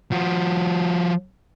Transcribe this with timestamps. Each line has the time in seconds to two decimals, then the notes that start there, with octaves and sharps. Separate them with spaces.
0.12 F3 F#4